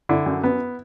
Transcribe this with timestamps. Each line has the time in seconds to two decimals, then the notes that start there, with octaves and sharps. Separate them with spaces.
0.09 D3 E4
0.26 F#2
0.44 B3